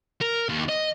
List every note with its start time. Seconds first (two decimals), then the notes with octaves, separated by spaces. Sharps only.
0.21 A#4
0.49 D#2
0.69 D#5